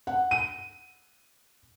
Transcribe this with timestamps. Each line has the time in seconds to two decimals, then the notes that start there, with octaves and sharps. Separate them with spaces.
0.07 F#5
0.31 D#7